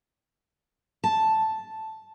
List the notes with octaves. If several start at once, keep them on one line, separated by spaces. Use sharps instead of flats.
A5